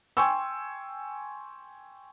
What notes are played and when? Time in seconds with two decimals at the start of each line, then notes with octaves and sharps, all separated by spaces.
0.17 G5 G#5 C6 C#6 E6